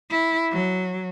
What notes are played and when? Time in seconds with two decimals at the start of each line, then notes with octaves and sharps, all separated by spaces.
0.11 E4
0.52 F#3